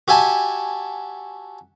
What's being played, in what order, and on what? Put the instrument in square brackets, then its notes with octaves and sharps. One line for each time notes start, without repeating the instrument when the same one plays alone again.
[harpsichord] F#4 G4 E5 G#5 A5